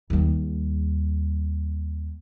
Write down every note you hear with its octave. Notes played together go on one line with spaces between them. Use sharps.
D#2 G3